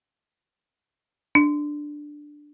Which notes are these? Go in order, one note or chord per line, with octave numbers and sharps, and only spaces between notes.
D4